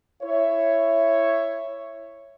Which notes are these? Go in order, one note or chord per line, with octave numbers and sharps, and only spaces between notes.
E4 C#5 E5